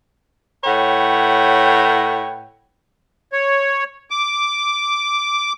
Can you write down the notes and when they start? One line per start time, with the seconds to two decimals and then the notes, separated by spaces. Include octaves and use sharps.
0.64 A2 B4 C#5 F#5 G5
3.33 C#5
4.11 D6